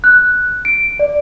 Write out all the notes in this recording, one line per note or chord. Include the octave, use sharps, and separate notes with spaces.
F#6
D7
D5